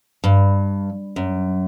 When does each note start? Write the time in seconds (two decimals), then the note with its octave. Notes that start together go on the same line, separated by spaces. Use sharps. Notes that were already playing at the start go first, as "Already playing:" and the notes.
0.24 G2
1.16 F#2